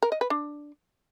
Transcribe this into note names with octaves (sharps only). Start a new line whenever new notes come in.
A#4
D#5
B4
D4